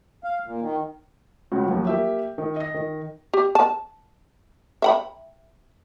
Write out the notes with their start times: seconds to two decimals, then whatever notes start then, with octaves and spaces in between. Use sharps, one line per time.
0.24 F5
0.45 A#2
0.61 D#3
1.52 C#2 C#3 F#4
1.66 D#2 F3 F#3
1.87 A#3 G4 E5
2.38 D#3
2.56 D#5 A#6
2.75 D#3
3.34 G4
3.55 A5
4.82 E5 F#5 B5